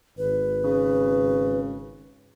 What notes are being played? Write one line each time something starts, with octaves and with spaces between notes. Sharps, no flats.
G#1 B4
C#3